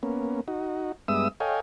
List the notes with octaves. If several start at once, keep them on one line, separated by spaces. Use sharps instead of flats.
A#3 B3 C#4
D#4 F#4
G2 G#3 B3 E5 D#6 E6
A4 C#5 D#5 F5 G5 G#5